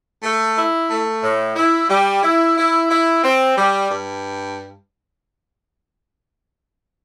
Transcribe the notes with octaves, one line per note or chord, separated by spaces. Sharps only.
A3
E4
A3
A2
E4
G3
E4
E4
E4
C4
G3
G2